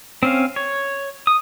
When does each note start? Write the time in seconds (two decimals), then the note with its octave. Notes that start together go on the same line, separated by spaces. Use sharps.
0.23 C4 C#4 F5
0.56 C#5
1.27 D#6